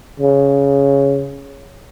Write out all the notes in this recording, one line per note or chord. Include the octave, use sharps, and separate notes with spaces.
C#3